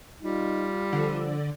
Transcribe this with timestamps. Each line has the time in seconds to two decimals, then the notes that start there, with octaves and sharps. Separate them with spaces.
0.23 G3 D#4 F4
0.93 D3 F3